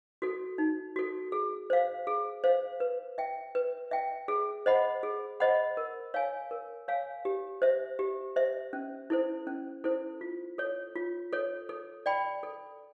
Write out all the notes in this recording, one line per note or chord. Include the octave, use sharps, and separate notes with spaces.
F#4 A4
D#4
F#4 A4
G#4
C5 F5
G#4
C5 F5
B4
E5 G5
B4
E5 G5
G#4
C5 D#5 F#5 B5
G#4
C5 D#5 F#5 B5
A#4
C#5 F5 G#5
A#4
C#5 F5 G#5
G4
C5 E5
G4
C5 E5
C#4
E4 A4 C5
C#4
E4 A4 C5
F4
A4 C#5
F4
A4 C#5
A4
D5 G5 B5
A4